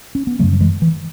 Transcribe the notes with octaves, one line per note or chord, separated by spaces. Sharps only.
C#4
B3
F#2 C#3 F#3 A3
F#3
E3 G#3
E3